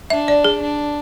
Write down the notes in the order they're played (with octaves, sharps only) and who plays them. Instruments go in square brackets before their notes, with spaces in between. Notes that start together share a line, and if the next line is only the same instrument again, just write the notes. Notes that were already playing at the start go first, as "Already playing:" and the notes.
[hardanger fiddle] D4 [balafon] E5
[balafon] D5
G#4
[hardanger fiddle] D4